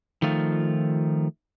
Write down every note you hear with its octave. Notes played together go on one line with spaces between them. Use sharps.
D#3 F3 A3 F4